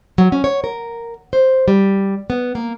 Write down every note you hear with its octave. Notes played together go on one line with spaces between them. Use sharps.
F#3
C#4
C#5
A#4
C5
G3
B3
A#3